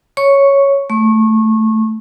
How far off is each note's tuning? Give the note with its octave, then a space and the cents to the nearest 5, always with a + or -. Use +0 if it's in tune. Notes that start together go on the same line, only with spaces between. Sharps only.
C#5 +0 C#6 +0
A3 +0 C#6 -25